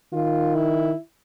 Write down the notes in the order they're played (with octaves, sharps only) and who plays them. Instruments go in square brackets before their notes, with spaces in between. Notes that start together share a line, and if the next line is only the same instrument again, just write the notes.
[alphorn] D#3 [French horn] F4
[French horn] E4